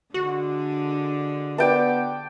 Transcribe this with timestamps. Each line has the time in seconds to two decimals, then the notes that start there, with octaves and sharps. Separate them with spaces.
0.14 D3 G#3 D4 F#4
1.58 B3 D5 G5 A5